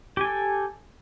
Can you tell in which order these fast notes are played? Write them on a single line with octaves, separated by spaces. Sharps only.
G4 G#5 A4